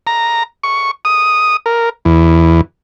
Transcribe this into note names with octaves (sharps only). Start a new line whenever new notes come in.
A#5
C#6
D#6
A#4
E2